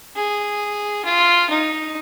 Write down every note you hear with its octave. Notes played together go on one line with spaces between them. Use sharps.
G#4
F4
D#4